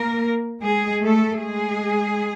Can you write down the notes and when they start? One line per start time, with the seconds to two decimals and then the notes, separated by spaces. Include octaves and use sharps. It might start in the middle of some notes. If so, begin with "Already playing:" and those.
Already playing: A#3 A#4
0.62 G#3 G#4
1.02 A3 A4
1.42 G#3 G#4